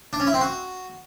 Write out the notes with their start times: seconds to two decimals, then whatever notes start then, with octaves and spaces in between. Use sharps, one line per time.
0.13 D4
0.20 C#4
0.27 E4
0.34 C4
0.41 F#4